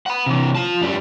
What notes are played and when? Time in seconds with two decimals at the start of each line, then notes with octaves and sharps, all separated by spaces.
0.06 F#5 B5
0.26 C3 E3
0.55 F4 A5
0.82 F#2 G3